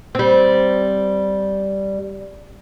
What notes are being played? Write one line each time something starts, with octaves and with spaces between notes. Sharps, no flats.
G3 C4